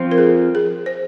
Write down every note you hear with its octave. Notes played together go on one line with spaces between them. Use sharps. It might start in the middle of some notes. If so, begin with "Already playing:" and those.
Already playing: F3 C4 F4
A#4
G#4
G#4
C5